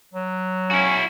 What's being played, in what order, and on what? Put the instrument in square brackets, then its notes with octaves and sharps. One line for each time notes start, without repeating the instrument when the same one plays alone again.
[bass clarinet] F#3
[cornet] C#4 [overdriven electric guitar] E4 F#4